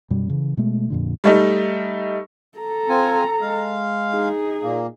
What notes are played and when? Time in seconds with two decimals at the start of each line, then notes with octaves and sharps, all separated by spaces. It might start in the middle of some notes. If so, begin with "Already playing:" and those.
0.10 F#2 B2 G3
0.30 C#3 E3
0.57 B2 G#3 A3
0.90 F2 A#2 D3
1.24 G3 A3 D#4
2.58 A4 A#5
2.89 C4 F4 G#5
3.41 G#3 F5
4.12 D#4 G#4
4.63 A#2 A#3